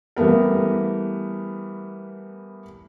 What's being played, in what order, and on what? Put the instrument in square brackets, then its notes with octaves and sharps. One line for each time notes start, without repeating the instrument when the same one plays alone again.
[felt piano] E3 G3 A3 B3 A#4